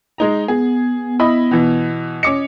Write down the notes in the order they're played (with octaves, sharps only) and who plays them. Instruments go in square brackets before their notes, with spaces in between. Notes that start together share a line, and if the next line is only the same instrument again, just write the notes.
[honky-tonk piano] G#3 D#4 A#5
[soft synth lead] B3 [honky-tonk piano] G#4
[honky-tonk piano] E4 D#5 B5
B2 E3
[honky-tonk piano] C#4 D6 C#7 [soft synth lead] D#5